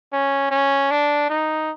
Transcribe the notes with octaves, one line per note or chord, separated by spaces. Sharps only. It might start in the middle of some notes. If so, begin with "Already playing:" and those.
C#4
C#4
D4
D#4